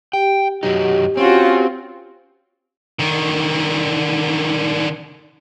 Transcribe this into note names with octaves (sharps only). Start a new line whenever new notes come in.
G4 G5
F#2 F#3 D#4 G4
C4 C#4 F4 F#4
D3 D#3